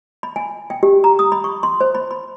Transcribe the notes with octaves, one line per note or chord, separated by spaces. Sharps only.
B5
G#5
G5
G4
A#5
D#6
B5
C#6
C6
C5
B5
B5